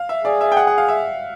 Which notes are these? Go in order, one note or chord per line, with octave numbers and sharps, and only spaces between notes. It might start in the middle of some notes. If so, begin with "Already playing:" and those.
Already playing: F5
E5
G#4 D5
E5
G5
F#5
F#5
F5
E5